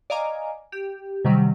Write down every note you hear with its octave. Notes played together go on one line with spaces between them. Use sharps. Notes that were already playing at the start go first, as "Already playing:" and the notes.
D5 D#5 F5 G#5 A#5 D6
G4
C3 D#3 F#3 G3